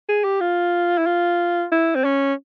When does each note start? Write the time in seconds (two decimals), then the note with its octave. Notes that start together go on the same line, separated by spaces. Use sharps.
0.09 G#4
0.24 G4
0.41 F4
0.98 E4
1.06 F4
1.72 E4
1.95 C4
2.04 C#4